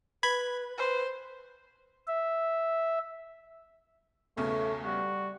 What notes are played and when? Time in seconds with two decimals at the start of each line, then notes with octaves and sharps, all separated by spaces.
0.23 B4 B5 G#6
0.78 B4 C5
2.08 E5
4.37 B1 E2 C#3 A3 C#5
4.84 G3 F#4